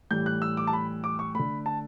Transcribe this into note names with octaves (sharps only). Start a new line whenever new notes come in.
A2 E3 G3 G6
F#6
E6
D6
A5
B5
D6
C#6
D3 A3 B5
A5